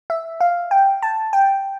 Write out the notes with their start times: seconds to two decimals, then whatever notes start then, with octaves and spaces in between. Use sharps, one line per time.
0.10 E5
0.41 F5
0.71 G5
1.03 A5
1.33 G5